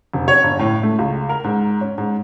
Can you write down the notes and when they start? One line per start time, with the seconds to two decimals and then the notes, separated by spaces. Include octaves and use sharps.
0.14 F1
0.28 C#5
0.44 G1
0.59 A2
0.83 A3
0.99 C#2
1.29 A#4
1.44 G#2
1.81 C#4
1.98 G#2